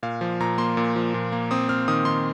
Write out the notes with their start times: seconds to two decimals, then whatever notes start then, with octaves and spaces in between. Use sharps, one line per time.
0.03 A#2 F5
0.21 F3
0.40 A#2 A#5
0.58 A#3 C6
0.77 A#2
0.96 F3
1.14 A#2
1.32 A#3
1.51 C4 D#6
1.69 C4 F6
1.88 D#3 D#6
2.05 D#3 C6